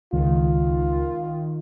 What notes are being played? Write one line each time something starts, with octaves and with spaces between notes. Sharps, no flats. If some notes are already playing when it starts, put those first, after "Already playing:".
C#2 D#3 F4